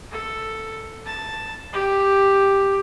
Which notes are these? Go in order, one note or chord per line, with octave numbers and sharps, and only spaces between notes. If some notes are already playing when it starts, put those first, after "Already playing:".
A4
A5
G4